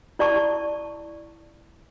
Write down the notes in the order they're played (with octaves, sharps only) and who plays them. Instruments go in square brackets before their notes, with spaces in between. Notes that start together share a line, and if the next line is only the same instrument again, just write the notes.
[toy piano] E4 D5 A5 C#6